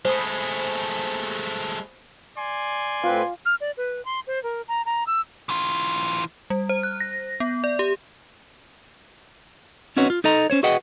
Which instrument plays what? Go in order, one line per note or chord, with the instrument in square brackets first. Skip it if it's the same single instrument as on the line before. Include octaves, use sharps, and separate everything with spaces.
[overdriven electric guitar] G#3 A3 [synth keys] C5 B5 D#6
[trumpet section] D5 G#5 C6
[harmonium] A2 C4 B4 [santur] F4
[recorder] F6
D5
B4
C6
C5
A#4
A#5
A#5
E6
[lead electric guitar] E3 F4
[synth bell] G3
C5
F#6
A#6
B3
D5
G4
[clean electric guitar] C4 C#4 D#4 F#4 B4 C#5
F4
D#4 A4 D#5 A#5
C#4 C5 C#5
F#4 G#4 B4 D#5 F#5 G5